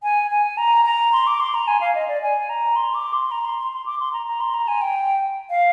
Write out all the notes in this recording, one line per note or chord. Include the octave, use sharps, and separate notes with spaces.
G#5
G#5
A#5
A#5
C6
D6
C6
A#5
G#5
F5
D#5
D5
G#5
A#5
C6
D6
C6
A#5
C6
C6
C6
D6
C6
A#5
A#5
C6
A#5
G#5
G5
F5